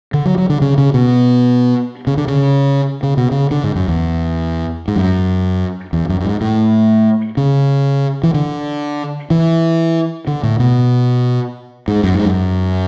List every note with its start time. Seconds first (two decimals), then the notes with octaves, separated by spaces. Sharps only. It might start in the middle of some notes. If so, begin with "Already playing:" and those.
0.14 D3
0.26 F#3
0.38 F#3
0.49 D3
0.61 C#3
0.78 C#3
0.94 B2
2.07 C#3
2.17 D3
2.28 C#3
3.03 C#3
3.17 B2
3.31 C#3
3.51 D3
3.64 G#2
3.76 F#2
3.88 E2
4.88 G#2
4.96 F#2
5.93 E2
6.09 F#2
6.20 F#2
6.25 G#2
6.41 A2
7.37 C#3
8.23 E3
8.34 D3
9.30 E3
10.27 D3
10.43 A2
10.59 B2
11.88 G#2
12.04 F#2
12.15 G#2
12.25 F#2